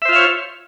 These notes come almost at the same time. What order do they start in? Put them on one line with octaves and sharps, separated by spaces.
E5 C5 F4 F5 C#5